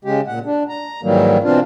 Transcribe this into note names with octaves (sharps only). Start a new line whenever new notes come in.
C#3 G#3 G4
A#2 F#5
D4
A#5
G#2 D#3 E3 F#3 G3 A#3
B2 E3 C4 D4 F4